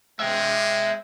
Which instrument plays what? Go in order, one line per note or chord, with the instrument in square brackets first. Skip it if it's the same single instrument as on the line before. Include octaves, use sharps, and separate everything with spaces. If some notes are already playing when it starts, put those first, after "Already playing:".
[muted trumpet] G#3 [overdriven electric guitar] E5 G5